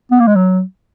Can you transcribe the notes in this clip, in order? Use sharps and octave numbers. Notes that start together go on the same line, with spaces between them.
B3
A#3
G#3
F#3